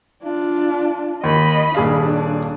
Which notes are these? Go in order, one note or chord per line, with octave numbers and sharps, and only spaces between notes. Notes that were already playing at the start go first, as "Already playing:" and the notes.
D4 F4
D#2 D#5 B5
D#1 D4 G#4 F5